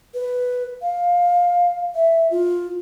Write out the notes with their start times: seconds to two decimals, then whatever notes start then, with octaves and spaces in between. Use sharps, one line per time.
0.14 B4
0.82 F5
1.95 E5
2.31 F4